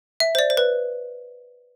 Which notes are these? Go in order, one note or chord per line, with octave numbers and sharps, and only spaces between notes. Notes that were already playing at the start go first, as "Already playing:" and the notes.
E5
C5
D5
C5
B4